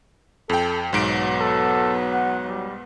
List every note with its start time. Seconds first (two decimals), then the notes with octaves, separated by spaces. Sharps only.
0.50 F2 A4 G5
0.93 B1 G#2 F#3 B3 D7
1.40 A4
2.13 F#5
2.49 G3